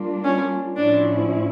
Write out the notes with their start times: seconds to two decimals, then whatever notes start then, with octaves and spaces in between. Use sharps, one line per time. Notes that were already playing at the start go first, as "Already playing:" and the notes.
Already playing: G3 A#3 D4 F4
0.24 C#4
0.76 A2 F3 C#4 D4 E4